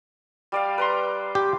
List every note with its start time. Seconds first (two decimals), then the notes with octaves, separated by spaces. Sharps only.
0.52 G3 D5 F5
0.78 B4 A#5 C6
1.35 G4